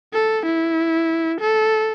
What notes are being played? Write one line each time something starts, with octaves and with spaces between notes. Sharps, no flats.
A4
E4
A4